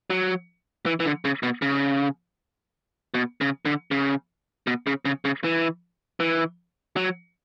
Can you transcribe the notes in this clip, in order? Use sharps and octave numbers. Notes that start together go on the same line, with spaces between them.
F#3
E3
E3
D3
C#3
B2
C#3
B2
C#3
D3
C#3
B2
C#3
C#3
C#3
E3
E3
F#3